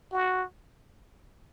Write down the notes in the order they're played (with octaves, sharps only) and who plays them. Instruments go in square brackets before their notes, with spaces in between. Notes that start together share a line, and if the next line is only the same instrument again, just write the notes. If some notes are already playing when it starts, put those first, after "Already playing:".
[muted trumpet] F#4